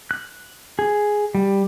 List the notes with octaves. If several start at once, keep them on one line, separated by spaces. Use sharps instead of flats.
F#6
G#4
G3